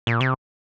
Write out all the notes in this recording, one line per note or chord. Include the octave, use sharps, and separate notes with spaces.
A#2
C3